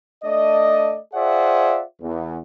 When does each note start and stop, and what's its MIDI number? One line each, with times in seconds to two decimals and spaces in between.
0.24 0.98 57
0.24 0.98 62
0.24 0.98 74
0.24 0.98 75
1.14 1.82 65
1.14 1.82 68
1.14 1.82 72
1.14 1.82 74
1.14 1.82 76
1.14 1.82 78
2.01 2.39 40